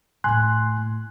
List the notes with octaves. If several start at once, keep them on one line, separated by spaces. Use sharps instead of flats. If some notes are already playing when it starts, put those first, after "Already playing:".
A2 A3 G#5 C6 F#6